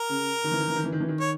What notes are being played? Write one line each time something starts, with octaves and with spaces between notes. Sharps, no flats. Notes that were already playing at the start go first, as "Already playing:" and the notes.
Already playing: A#4
C#3
D#3
E3
D#3
E3
D#3
E3
D#3
E3
D#3
C#5